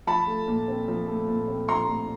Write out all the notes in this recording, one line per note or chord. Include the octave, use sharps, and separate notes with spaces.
F3 A5 B5
A3
A#2
C4
F3
A3
A#2
C4
F3 A#5 C6
A3